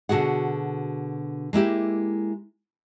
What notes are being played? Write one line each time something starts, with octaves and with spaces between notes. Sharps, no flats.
B2 D3 F#4 G#4 F#5
G#3 A#3 E4 G4